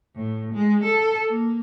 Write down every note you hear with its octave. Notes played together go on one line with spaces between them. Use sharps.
A2
G#3
A4
A#3